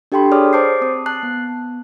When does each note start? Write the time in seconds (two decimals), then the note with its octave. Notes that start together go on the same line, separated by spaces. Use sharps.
0.12 D4 G4 A4 G5 B5 C6
0.31 G#4 C#5 D5 D6 D#6 F6
0.53 C5 A5 D6 G6 C7
0.81 C4 D#6
1.06 A5 F#6 C7
1.23 B3